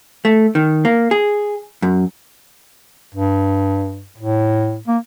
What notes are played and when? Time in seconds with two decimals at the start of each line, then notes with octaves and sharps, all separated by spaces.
0.25 A3
0.55 D#3
0.85 A#3
1.11 G#4
1.82 F#2
3.14 G2
4.18 A2
4.88 A#3